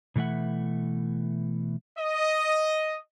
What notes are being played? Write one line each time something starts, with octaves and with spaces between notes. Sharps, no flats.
B2 E3 A3 E5 F#5
D#5